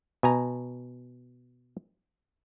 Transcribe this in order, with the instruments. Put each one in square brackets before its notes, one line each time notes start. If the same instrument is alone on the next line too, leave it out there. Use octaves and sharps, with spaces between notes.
[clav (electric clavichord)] B2 G#5 A#5